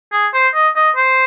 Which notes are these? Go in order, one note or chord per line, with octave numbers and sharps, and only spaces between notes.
G#4
C5
D#5
D#5
C5